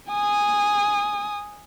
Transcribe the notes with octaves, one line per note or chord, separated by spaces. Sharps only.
G#5 D#6